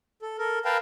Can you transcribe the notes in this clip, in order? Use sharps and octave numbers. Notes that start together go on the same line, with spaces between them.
A4
A4 A#4
A#4 B4 F5 G5 A5